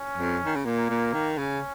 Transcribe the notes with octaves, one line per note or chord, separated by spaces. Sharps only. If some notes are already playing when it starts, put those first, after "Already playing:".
Already playing: C#4
F2
D#3
C#3
A#2 A#3
A#2
D#3
C#3 C#4